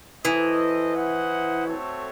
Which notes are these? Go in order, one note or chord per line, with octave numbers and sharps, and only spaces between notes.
E3 F#4 A4 C5 D#5
E4 C5 D#5 F#5
A3 C4 F#4 A4 C#5